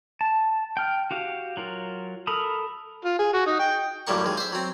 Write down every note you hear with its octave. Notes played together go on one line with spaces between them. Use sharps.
A5
G5 F6
F#4 G4 F5
F#3 F4 A#4
A4 A#4 B5 D#6
F4
G#4
F#4
D#4
G5
F#2 A2 G3 A#3 C#6
D#2 G#3
C5 E5
F#3 C4